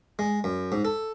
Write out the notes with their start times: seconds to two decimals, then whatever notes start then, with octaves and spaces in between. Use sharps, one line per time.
0.19 G#3
0.44 F#2
0.72 G#2
0.85 A4